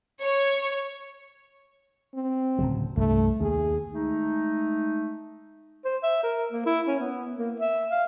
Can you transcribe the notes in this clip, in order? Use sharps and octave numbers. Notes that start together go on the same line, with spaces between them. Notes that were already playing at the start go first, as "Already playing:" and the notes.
C#5
C4
D1 C#3 F#3
C2 G2 A3
D#2 G#4
G#3 A3 D#4
C5
E5
A#4
A#3
E4
C#4
B3
A#3
E5
F5